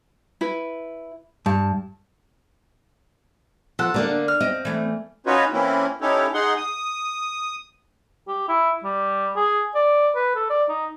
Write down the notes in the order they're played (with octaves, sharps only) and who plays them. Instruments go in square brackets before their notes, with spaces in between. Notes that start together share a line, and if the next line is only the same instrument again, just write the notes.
[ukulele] E4 B4
[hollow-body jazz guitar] G2 [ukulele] A5
[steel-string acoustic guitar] F3 [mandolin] A4 F#5
[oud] D3 D4 [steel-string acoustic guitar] A#3 A#4
[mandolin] F6
[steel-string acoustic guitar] C4 [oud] D#5
[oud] E3 A3
[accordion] C#4 D#4 F4 F#4 B4 C#5
E3 A#3 C4 C#4 E4
C#4 D#4 E4 G4 A4 C#5
D#4 G#4 F#5 C6
D#6
[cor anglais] G4
E4
G3
G#4
D5
B4
A4
D5
D#4